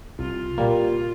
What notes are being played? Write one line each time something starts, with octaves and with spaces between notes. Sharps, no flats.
C2 F4
A#2 G3 A#3